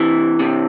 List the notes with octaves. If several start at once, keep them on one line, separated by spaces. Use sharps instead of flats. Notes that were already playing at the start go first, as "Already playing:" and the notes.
Already playing: C3 E3
C3